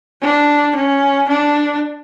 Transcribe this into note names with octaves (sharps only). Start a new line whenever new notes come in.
D4
C#4
D4